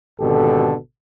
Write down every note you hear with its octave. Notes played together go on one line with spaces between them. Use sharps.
G#1 B2 D3 G4 A4